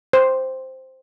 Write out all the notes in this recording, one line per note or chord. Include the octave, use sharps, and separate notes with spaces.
C5